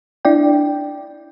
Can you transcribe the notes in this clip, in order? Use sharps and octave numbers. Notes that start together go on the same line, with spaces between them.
D4 E4 D5 G5